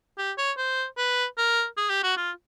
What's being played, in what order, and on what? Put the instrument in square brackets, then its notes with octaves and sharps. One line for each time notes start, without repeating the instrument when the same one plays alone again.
[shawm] G4
C#5
C5
B4
A#4
G#4
G4
F#4
F4